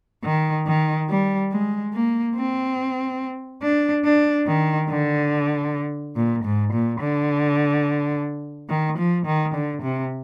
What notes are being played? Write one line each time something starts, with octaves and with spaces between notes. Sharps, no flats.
D#3
D#3
G3
G#3
A#3
C4
D4
D4
D#3
D3
A#2
G#2
A#2
D3
D#3
F3
D#3
D3
C3